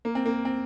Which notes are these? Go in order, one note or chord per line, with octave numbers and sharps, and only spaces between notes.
A#3
C4
A#3
C4